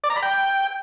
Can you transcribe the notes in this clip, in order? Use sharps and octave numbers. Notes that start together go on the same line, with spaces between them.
D5
A#5
B5
G5